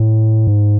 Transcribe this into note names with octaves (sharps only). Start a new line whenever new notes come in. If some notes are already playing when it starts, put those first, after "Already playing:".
Already playing: A2
G#2